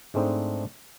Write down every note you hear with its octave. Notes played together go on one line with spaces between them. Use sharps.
G#2 G#3 A3 C4 D4 D#4